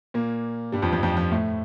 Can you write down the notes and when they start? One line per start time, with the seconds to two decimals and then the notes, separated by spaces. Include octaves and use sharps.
0.14 A#2 A#3
0.72 G2 G3
0.82 F2 F3
0.92 F2 F3
1.03 F2 F3
1.17 F2 F3
1.32 A2 A3